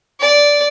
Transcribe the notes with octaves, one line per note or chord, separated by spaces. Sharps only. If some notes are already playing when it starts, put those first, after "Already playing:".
D5